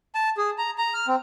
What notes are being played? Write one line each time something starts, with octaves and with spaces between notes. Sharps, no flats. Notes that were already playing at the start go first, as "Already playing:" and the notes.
A5
G#4
A#5
A#5
F6
C4